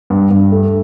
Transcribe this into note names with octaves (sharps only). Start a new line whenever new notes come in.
G2
G2
A3